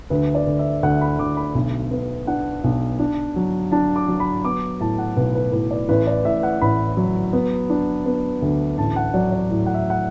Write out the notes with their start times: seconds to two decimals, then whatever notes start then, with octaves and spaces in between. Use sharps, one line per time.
0.10 D2 B4
0.35 D5
0.47 D2
0.59 E5
0.83 D2 F#5
1.01 B5
1.19 D2 D6
1.37 B5
1.55 B1
1.91 B3
2.27 D4 F#5
2.64 B1
2.99 D4
3.36 F#3
3.72 D4 A5
3.96 D6
4.08 F#3
4.20 B5
4.45 B3 D6
4.80 A2 A5
4.98 F#5
5.17 B1 B4
5.35 B4
5.52 A2 B4
5.71 D5
5.89 A1 B4
6.07 D5
6.25 A2 E5
6.43 F#5
6.61 A1 B5
6.97 F#3
7.33 B3
7.70 D4
8.06 B3
8.42 D2
8.78 A1 A5
8.96 F#5
9.14 F#3 D5
9.32 D5
9.50 A2
9.66 F#5
9.74 E5
9.90 F#5